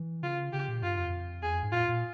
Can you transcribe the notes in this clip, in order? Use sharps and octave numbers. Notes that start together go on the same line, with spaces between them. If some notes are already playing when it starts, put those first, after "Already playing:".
Already playing: E3
C#3 F4
C#3 G4
A#2
G2 F4
F2
E2 G#4
F2
G#2
A#2 F4
A#2